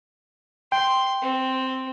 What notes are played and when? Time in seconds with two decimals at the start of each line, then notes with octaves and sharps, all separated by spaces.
0.72 G5 C6
1.22 C4